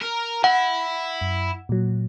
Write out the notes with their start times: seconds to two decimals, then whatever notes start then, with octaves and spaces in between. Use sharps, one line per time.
0.01 A#4
0.44 E4 F#5
1.21 F#2
1.69 A#2 F#3